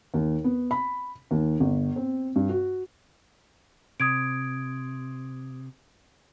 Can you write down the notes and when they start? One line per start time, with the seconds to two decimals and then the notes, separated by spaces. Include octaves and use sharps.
0.14 D#2
0.44 B3
0.71 B5
1.31 D#2
1.60 G1
1.96 C4
2.36 G2
2.49 F#4
4.00 C3 D#6 G#6 D7